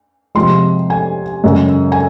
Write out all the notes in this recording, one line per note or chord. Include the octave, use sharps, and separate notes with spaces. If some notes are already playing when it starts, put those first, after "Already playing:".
C3 F3 G#3 C6
G#5
F#2 C#3 G#3
G#5